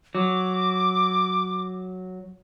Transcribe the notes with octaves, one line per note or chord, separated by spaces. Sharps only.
F#3 D6